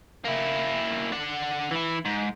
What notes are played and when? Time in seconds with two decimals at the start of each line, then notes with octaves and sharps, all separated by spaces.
0.24 A#3 E4
1.12 D4 F#5
1.71 E3 E4
2.05 G#2